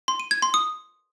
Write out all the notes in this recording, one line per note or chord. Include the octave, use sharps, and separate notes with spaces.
C6
D#7
G#6
C6
D#6